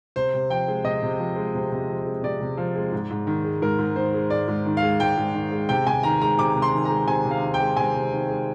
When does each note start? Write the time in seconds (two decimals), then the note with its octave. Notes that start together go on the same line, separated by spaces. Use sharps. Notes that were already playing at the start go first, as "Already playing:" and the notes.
0.16 C3 C5
0.34 C3
0.50 F3 G5
0.68 G#3
0.85 C3 D#5
1.03 C3
1.19 F3
1.36 G#3
1.55 C3
1.72 C3
1.89 F3
2.07 G#3
2.23 C3 D5
2.41 C3
2.57 F3
2.75 G#3
2.92 G#2
3.10 G#2
3.27 D#3
3.45 G#3
3.62 G#2 A#4
3.79 G#2
3.96 D#3 C5
4.14 G#3
4.30 G#2 D5
4.48 G#2
4.66 D#3
4.77 F5
4.83 G#3
5.00 G#2 G5
5.17 G#2
5.34 D#3
5.52 G#3
5.69 C3 G5
5.87 C3 G#5
6.03 D#3 A#5
6.22 G#3 A#5
6.38 C3 D6
6.56 C3
6.62 C6
6.73 D#3
6.85 A#5
6.91 G#3
7.07 C3 G#5
7.25 C3
7.31 F5
7.42 D#3
7.54 G5
7.60 G#3
7.77 C3 G#5
7.94 C3
8.12 D#3
8.29 G#3